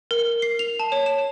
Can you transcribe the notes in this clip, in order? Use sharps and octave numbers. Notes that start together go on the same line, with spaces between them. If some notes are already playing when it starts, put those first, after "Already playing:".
A#4
C7
F7
A5
C#5
E7